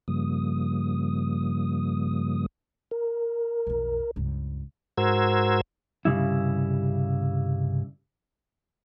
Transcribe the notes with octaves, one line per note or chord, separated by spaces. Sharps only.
G2 C#3 F3 G3 A#3 D#6
A#4
B1 F2
C#2 G2
G#2 F#4 A#4 C5 E6 G#6
C2 G2 C#3 G3 E4